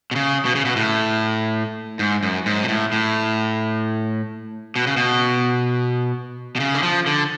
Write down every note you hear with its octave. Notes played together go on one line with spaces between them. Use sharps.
B2
C#3
B2
C#3
B2
A2
G#2
F#2
G#2
B2
A2
A2
B2
C#3
B2
B2
C#3
D3
F3
D3